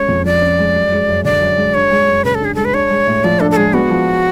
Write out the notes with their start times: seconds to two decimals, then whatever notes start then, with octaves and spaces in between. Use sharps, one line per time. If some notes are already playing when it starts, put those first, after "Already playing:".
Already playing: G#3 C#4 C#5
0.08 F2
0.25 F3 D5
0.42 C#4
0.59 G#3
0.76 F#2
0.92 G#3
1.08 F#2
1.24 D3 D5
1.41 F#2
1.57 G#3
1.74 D4 C#5
1.91 G#3
2.08 F#2
2.25 C#3 B4
2.35 A4
2.41 D4 G#4
2.55 G#3 A4
2.65 B4
2.74 D4 C#5
2.90 G#3
3.07 A2
3.24 F3 D5
3.40 D4 A4
3.51 A4
3.56 G#3 G#4
3.74 B3 F#4
3.90 F3